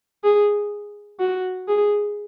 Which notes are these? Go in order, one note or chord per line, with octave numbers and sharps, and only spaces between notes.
G#4
F#4
G#4